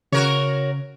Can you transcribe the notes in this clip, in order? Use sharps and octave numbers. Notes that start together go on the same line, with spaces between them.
C#3 F#4 A#4 C#5